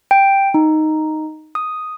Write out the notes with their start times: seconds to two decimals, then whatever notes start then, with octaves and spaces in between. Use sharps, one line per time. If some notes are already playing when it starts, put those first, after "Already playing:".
0.11 G5
0.54 D#4
1.55 D#6